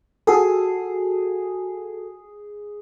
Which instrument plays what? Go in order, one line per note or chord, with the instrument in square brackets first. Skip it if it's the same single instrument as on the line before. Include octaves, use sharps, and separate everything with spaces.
[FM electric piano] F#4 A4 [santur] G#4